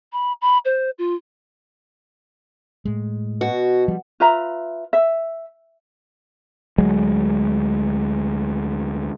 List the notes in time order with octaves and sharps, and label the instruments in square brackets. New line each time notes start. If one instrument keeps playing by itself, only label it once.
[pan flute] B5
B5
C5
F4
[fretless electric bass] A2 G#3
[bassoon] B2 [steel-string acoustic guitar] F#4
[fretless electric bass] F3 G3
[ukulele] F4 B4 E5 A#5
E5
[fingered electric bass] D2 F#3 G#3